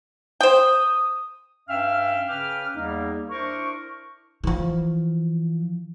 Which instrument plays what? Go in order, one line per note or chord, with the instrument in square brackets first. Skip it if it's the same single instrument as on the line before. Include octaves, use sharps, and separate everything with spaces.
[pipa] C5 G5 [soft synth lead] D#6
[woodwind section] G2 C#4 E5 F5 G5 F6
C#3 C#4 B4 G5 D6 F6
E2 G3 A#3 D#4
D4 E4 A#4 C5 C#6
[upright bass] E3 F3